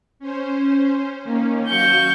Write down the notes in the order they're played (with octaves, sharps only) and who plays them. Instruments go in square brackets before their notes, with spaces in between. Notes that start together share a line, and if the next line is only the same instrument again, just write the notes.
[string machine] C#4 C5
D#3 A#3 C#4
[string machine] F#3 F#4 F5 [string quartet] C#6 G6